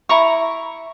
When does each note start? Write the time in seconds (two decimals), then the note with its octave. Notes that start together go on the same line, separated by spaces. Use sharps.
0.09 E4 A#5 C#6